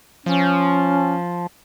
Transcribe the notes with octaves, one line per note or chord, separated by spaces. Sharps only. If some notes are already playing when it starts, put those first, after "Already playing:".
F3 C#4